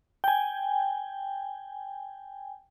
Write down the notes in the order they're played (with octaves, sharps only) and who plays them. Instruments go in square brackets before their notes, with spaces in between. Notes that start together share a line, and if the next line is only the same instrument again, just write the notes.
[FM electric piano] G5 G#5